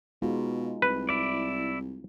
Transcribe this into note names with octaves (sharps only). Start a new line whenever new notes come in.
B2 G#3 D#4 F4
C2 B4
E4 D5